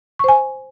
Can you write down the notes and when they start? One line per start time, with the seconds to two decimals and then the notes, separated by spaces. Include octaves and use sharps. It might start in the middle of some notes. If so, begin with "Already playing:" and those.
0.19 C#6
0.24 C5
0.29 G#5